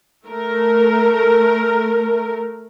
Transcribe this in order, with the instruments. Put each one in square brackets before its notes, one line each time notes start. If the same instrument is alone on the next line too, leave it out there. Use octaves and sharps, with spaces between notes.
[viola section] A3 A#4